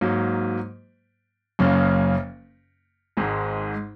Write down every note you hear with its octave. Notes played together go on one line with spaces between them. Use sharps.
G#2 F#3 A#3
F#1 F#2 C#3 A#3 C#4
G#1 G#2 G#3